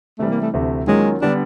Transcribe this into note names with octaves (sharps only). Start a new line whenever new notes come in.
C3 E3 G3 A3
A#3
A3
D2 C3 E3 A3
D#3 F#3 G#3 A#3 C#4 F4
D3 G3 B3 D4